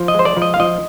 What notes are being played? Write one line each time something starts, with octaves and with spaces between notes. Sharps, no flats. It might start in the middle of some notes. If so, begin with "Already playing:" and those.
Already playing: F3
D#5
G#3 C5
D5
F3
D#5
F5
F3 D#5